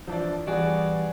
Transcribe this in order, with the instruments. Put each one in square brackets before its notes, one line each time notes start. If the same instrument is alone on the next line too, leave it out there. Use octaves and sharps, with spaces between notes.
[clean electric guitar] E3 D4 [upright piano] F3 D5
[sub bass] E3 [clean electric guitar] G3 B3 [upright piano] F#4 G#4 [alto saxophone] D5